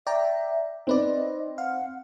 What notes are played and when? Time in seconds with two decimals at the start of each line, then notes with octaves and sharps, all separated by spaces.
0.07 D5 E5 G5 A#5
0.87 C4 D#4 B4 D5 D#5
1.58 F5 F#5